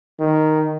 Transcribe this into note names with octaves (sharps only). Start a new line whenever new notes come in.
D#3